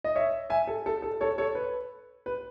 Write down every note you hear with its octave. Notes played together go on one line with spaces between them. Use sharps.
D#5
C#5 E5
E5 G#5
A4
A4
A4
A4 C#5
A4 C#5
B4
B4